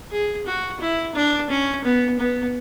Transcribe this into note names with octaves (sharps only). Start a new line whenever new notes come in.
G#4
F#4
E4
D4
C#4
B3
B3